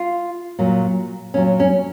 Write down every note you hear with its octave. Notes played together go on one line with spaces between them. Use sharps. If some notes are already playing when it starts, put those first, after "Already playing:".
Already playing: F4
A#2 F#3
A#2 F#3 C#4
C#4